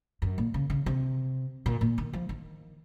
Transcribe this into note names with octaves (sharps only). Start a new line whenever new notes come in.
F#2
A#2
C#3
C#3
C3
A#2
A#2
D#3
F3
D#3